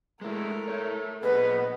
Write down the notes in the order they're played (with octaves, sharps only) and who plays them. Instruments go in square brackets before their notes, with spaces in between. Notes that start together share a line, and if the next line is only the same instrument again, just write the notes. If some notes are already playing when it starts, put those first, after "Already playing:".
[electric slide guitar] G#3 E4 [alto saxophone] A3 [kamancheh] A#4
[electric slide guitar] A4 C#5
[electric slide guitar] A#2 G#4 [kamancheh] B3 [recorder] B4 [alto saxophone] D#5